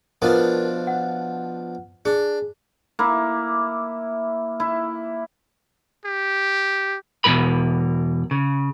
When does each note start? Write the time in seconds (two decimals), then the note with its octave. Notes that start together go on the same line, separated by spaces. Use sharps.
0.22 B2 F3 D4 A#4 B4
0.87 F#5
2.05 D4 G#4
2.99 A#3 E4
4.60 E4
6.05 G4
7.24 E2 B2 D#3 F#3 A#4 B5
8.31 C#3